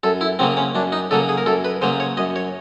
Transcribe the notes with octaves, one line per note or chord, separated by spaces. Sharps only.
F#2 A4
E4
C#3 F#3 A#3 C4
C#4
F#2 D4
D#4
C#3 F#3 A#3 A4
G#4
A#4
F#2 A4
B4
C#3 F#3 A#3 C5
C#5
F#2 D#5
C#5